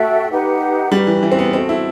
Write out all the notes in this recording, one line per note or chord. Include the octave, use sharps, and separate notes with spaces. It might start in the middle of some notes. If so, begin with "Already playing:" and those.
Already playing: A3 F#4 A4 E5 G5
D#4 G4 B4 F#5
G3 D#4 F#4 B4
E3
E3
C4
B3
C4 F#4 A4 D#5
E4